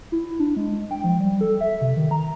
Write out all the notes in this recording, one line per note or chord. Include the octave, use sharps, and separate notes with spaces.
E4
D4
G#3
G5
F3
G3
A4
E5
C3
D#3
A#5